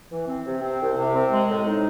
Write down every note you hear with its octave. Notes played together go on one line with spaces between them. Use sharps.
E3
C4
C3
C4
C2
C3
C4
G#3
A2
D#4